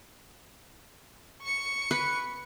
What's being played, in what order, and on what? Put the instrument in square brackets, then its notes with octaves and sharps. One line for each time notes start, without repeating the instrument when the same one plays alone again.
[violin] C#6 C#7
[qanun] B4